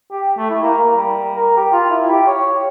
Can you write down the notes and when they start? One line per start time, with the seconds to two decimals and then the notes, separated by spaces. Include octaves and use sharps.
0.12 G4
0.38 A3
0.50 E4
0.63 A#3
0.78 A#4
0.96 G3
1.35 A#4
1.57 G4
1.72 F4
1.90 E4
2.11 G4
2.27 C#5